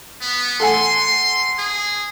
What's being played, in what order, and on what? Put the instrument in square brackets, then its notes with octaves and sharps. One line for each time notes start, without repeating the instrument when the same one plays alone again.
[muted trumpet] B3
[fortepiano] A4 F#5 G#5 [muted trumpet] C6
[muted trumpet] G#4